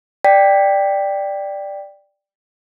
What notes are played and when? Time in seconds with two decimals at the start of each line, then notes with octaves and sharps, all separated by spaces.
0.24 D5 G5 B6